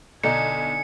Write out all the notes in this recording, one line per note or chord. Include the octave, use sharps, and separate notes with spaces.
B1 D3 D#4 G#5 C#7